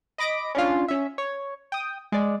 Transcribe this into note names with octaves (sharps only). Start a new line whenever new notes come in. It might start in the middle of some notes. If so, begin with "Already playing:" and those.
D#5 B5 D6 A#6 D7
C#4 D4 F4
C#4 E5
C#5
G5 D#6
G#3 D5